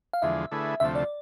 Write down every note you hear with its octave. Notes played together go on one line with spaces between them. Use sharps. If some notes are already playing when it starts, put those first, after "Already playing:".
F5
E2 D3 F3 G#3 E5
D3 A3 E4 G#4 B4
D2 C3 F3 A3 E5
D5